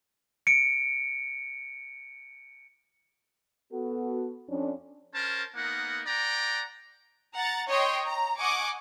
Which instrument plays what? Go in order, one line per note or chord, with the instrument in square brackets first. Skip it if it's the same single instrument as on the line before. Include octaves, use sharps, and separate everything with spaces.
[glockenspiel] C#7 D7
[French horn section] B3 F#4 A4
F2 C#4 D4
[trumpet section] C#4 A#4 C5 A5
A#3 B3 D#4 A#4 F#5
D5 F#5 G5 A#5
[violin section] F#5 A#5 A6
C#5 D#5 G5 C6
A#5
D#5 F#5 G#5 C#6 D6